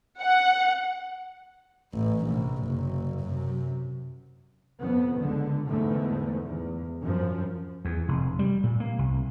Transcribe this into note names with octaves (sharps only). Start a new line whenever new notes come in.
F#5
A1
A#1 C3
F#1
F#2 C3
F2 B3
C#2 D3
E2 G#2 D3 A3
E2
F#2 F3
E2
F1
G3
A#2
A#3
C2